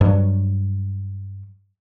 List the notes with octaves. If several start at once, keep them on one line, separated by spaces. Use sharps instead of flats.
G2 F#3